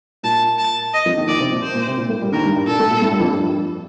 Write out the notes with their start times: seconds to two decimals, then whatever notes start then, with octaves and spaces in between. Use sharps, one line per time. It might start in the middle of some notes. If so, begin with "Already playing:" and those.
0.23 A#2 A#3 A5
0.58 A5
0.94 D#5
1.05 F2 F3
1.16 D#2 D#3
1.28 D#2 D#3 D5
1.40 C3 C4
1.51 A#2 A#3
1.63 C5
1.75 A#2 A#3
1.87 C3 C4
1.97 A#2 A#3
2.09 A2 A3
2.21 G2 G3
2.32 D#2 D#3 A#4
2.44 G2 G3
2.55 G2 G3
2.67 A#2 A#3 A4
2.79 A2 A3
2.91 A#2 A#3
3.02 A2 A3
3.11 G2 G3
3.20 F2 F3
3.28 G2 G3